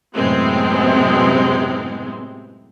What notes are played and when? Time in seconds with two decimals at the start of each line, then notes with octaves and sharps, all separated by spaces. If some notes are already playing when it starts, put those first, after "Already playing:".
0.15 F#2 A2 C3 G#3 B3 C4